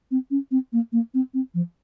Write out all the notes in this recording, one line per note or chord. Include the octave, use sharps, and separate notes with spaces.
C4
C#4
C4
A#3
A#3
C4
C4
F3